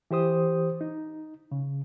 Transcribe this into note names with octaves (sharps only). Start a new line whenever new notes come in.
E3 G4 C5 D#6
D#4
C#3